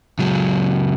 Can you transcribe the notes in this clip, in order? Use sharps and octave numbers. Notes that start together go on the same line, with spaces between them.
C#2 F#3